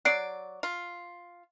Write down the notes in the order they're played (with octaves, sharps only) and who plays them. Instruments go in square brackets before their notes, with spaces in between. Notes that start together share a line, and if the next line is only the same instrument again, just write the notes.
[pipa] F#3 D5 [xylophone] F#6 C7 D7
[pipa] F4